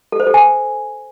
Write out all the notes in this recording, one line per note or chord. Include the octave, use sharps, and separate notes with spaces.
A4
C5
A4
G#5